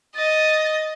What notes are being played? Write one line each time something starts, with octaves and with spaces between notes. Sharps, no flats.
D#5 A6